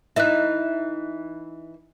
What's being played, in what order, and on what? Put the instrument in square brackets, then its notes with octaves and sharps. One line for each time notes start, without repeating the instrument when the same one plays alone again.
[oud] E3 D#4 [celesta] E5 F#6